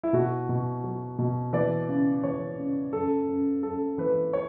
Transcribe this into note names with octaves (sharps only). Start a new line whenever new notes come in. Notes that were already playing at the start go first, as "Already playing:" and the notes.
E4
B2 F#4
B2
F#3
B2
E3 D5
C#3
E3 C#5
C#3
F#2 A4
F#2
F#2 A4
E3 B4
C#5